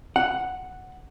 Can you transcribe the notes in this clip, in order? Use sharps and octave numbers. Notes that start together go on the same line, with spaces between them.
F#5